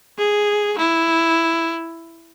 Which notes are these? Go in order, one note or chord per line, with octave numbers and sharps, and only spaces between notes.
G#4
E4